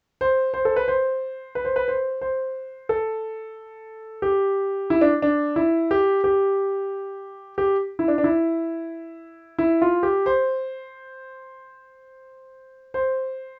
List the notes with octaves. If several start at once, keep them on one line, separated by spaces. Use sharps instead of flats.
C5
C5
A4
B4
C5
B4
C5
B4
C5
C5
A4
G4
E4
D4
D4
E4
G4
G4
G4
E4
D4
D4
E4
E4
F4
G4
C5
C5